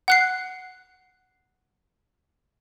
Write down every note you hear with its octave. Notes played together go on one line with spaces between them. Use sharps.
F#5 F#6 C7